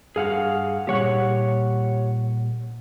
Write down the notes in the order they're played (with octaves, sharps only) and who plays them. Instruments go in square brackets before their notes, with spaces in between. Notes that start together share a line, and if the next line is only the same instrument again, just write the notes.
[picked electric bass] G2 [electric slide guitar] G#4 F5 F#5
[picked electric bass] A#2 G3 A#3 [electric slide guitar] G4 C#5 F#5